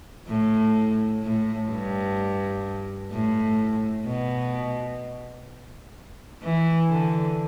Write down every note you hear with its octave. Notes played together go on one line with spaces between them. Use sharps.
A2
A2
G2
A2
B2
E3
D3